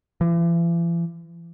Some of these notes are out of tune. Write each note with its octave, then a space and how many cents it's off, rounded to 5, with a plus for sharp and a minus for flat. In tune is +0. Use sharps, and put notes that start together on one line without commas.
E3 +45